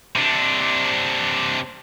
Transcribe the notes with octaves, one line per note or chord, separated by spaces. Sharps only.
C3 D4